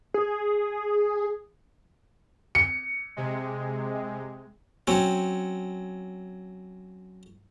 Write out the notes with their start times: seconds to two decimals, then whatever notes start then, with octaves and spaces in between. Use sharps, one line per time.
0.14 G#4
2.55 C#7
3.16 C3 G#3
4.87 F#3 C4 C#4